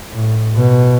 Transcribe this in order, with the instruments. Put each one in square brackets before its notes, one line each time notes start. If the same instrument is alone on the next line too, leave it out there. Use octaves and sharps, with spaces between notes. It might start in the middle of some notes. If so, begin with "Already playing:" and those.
[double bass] A2
B2